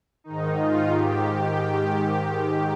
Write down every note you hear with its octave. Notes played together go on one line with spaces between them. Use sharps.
G#2 D#3 D#4
F4
G#2 D#3 G4